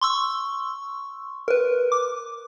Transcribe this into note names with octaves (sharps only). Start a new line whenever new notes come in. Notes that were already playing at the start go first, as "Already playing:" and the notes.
C6 C#6 E6
A#4 B4
D6